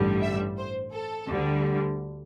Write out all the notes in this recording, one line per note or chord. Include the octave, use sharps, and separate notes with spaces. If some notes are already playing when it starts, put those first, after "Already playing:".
Already playing: A1 G2 D3 G3
E5
C5
A4
D2 D3 G3